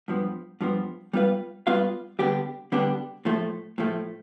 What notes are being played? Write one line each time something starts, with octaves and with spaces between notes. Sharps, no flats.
G2 F3 B3
G2 F3 B3
G3 B3 F4 B4 F5
G3 B3 F4 B4 F5
D3 G3 B3 D4 G4
D3 G3 B3 D4 G4
A2 F3 A3
A2 F3 A3